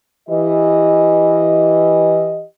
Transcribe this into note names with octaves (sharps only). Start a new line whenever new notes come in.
E3 G4 D#5